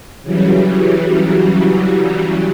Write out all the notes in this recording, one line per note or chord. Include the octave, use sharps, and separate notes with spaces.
C#3 E3 F#3 G3